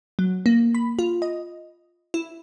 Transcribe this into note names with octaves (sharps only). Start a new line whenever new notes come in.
F#3
A#3
B5
F4
D#5
E4